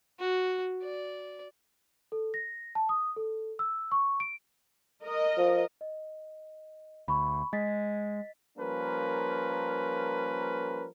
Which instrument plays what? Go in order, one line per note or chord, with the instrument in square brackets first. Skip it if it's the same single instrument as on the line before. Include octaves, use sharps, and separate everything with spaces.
[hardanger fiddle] F#4
D5
[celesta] A4
A#6
A5
D#6
A4
E6
C#6
D7
[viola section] A#4 D#5
[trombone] F3
[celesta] D#5
[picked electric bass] D2 [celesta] B5 C#6
[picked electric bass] G#3 [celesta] D#5 A6 B6
[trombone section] F3 G3 A#3 C#4 A#4 B4